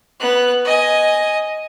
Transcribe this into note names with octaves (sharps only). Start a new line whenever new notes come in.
B3 F#6
D#5 G#5